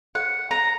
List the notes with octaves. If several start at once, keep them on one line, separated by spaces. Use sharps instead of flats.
F#5
A#5